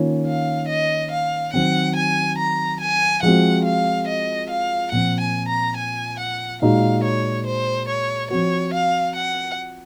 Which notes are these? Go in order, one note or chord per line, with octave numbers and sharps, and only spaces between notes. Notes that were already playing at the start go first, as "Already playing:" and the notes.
Already playing: D#3 A#3 C#4 F4
F5
D#5
F5
D#3 F#3 C4 F#5
G#5
A#5
G#5
F3 G#3 C4 F#4 F#5
F5
D#5
F5
A#2 F3 C4 F#5
G#5
A#5
G#5
F#5
A#2 G#3 D#4 F#4 F5
C#5
C5
C#5
F3 C4 F#4 C#5
F5
F#5